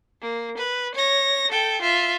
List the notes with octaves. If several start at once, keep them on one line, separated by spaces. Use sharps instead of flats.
A#3
B4
C#5 A#6
A4 G5
F4 E5